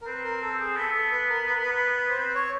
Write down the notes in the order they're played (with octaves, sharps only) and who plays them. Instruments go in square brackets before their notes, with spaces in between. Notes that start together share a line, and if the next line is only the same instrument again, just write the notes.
[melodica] A#4
[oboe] C4 [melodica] B4
[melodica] A#4
A4
G#4
[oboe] B3 [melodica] A4
[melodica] A4
B4
A#4
B4
A#4
B4
C5
[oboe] C4 [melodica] B4
[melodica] C#5